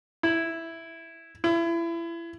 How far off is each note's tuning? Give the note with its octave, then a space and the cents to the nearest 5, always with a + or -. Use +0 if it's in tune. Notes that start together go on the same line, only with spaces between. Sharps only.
E4 +0
E4 +30